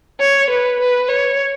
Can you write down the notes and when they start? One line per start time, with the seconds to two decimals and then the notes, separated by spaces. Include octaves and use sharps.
0.20 C#5
0.50 B4
0.80 B4
1.09 C#5